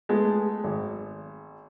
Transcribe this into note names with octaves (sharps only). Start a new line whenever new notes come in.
G#3 A3 B3 G#4
G#1